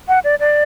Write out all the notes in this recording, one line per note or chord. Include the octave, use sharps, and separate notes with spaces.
F#5
D5
D5